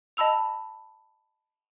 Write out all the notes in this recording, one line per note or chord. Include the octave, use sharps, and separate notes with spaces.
D#5 A5 B5 E6 F7